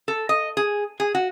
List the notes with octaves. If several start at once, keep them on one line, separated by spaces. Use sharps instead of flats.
A4
D#5
G#4
G#4
F#4